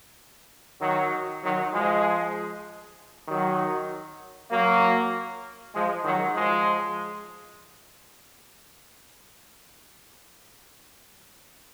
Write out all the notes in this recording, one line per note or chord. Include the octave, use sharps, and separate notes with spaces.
D#3 F#3
D#3 F#3
F3 G#3
D#3 F#3
F#3 A#3
F3 G#3
D#3 F#3
F3 G#3